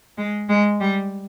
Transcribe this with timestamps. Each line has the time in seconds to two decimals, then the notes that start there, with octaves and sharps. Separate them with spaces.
0.18 G#3
0.49 G#3
0.80 G3